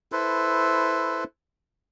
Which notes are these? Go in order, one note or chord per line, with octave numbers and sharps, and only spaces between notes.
E4 A4 B4 C5